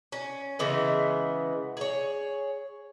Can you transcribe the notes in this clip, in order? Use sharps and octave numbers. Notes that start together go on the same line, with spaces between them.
C#4
C#3 E3 G#3 B3
G#4 C#5